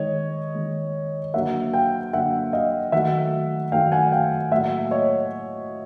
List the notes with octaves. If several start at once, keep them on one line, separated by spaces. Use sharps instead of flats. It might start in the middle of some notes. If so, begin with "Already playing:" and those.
Already playing: D#3 G#3 C#5 D#5
D#3 G#3
D3 F#3 A#3 E5 F#5
F5 G5
D3 F#3 A#3 E5 F#5
D#5 F5
D#3 F#3 A3 E5 F#5
D#3 F#3 A3 F5 G5
F#5 G#5
F5 G5
A2 F#3 A#3 E5 F#5
C#5 D#5